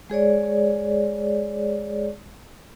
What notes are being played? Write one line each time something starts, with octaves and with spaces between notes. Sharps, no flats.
G#3 G#4 C#5 D5